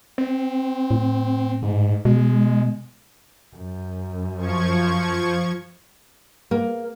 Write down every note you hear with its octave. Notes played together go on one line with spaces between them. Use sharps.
C4
A2
G#2
B2 G#3
F#2
F3 C#6 G#6
A#3